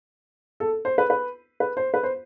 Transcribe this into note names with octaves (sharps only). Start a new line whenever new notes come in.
A4
C5
B4
B4
B4
C5
B4
C5